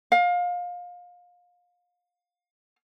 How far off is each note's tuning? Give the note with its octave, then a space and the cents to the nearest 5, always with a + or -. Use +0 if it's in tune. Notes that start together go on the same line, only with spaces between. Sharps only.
F5 +25